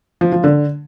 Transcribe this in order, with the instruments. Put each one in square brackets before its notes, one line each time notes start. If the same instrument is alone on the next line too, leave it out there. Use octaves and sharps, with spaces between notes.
[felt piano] F3
F3
D3